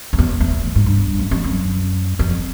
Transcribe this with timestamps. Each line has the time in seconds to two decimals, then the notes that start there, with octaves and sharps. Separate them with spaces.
0.13 F2
0.19 E2
0.40 E2
0.65 A2
0.75 G#2
0.86 G2
1.19 F#2
1.31 F2
1.44 F#2
2.19 F2